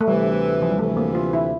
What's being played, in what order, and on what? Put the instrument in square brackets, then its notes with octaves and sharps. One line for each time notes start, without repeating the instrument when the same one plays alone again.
[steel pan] A3
[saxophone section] D2 C3 E3 [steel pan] G3
[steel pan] F3
G3
[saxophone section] D2 C3 E3 [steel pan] A3
[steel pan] A#3
F4
E4